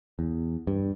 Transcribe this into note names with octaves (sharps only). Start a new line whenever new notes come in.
E2
G2